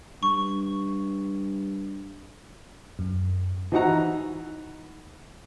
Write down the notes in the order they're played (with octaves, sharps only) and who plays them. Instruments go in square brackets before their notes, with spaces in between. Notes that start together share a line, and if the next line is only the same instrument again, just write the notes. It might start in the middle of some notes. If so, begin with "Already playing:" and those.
[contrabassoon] G2 [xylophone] C#6
[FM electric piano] F#2
[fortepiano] E3 D#4 F#4 F#5 A#5